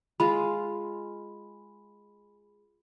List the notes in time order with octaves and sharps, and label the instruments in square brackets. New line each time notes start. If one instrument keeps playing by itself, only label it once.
[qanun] G#3 F4 [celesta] B5